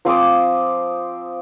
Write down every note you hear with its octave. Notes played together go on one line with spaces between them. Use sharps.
F3 C4 D6 D#6